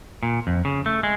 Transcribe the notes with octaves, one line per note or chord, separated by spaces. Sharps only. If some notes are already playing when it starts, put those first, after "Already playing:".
A#2
F2
C#3
A3
G#3